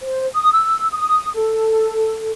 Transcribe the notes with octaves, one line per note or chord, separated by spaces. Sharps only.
C5
D#6
E6
D#6
A4